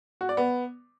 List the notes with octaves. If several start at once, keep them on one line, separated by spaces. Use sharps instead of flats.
F#4
D5
B3